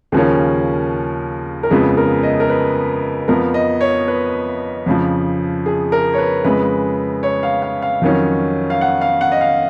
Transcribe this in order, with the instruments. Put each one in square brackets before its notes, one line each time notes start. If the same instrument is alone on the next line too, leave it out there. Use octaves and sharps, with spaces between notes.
[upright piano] D#2 C#3 F3 A#3 C#4 G#4
A#4
F2 C#3 F3 G#3 B3 G#4
A#4
D#5
A#4
B4
F2 F3 B3 A#4
D#5
C#5
B4
F2 C#3 F3
G#4
A#4
C#5
B4
F2 C#3 G#3 B4
C#5
F5
F5
F5
F2 D#3 F#3 C#4
F5
F#5
F5
F#5
D#5
F5